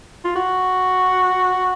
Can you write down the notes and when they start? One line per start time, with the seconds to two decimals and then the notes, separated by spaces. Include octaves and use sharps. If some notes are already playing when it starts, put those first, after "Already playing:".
0.24 F4
0.36 F#4